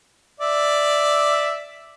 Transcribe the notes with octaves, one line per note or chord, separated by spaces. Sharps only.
D5 E5